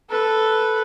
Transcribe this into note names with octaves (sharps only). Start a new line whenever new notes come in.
A4 B4